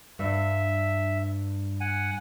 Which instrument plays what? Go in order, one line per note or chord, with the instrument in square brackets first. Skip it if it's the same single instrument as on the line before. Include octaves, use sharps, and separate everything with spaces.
[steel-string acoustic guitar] G2 [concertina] E5
[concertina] F#5 G#5